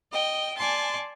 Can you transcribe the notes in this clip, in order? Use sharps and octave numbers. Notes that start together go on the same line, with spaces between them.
D#5 G5
D5 G#5 A5 C6